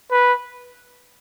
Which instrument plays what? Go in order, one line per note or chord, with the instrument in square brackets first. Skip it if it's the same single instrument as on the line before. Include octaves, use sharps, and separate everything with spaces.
[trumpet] B4